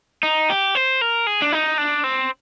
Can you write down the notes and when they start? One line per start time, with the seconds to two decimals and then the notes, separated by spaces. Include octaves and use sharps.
0.23 D#4
0.50 G4
0.75 C5
1.01 A#4
1.27 G#4
1.42 D4
1.52 D#4
1.78 D4
2.04 C4